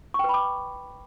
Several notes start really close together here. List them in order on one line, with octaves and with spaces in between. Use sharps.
C#6 G5 B4 B5 D6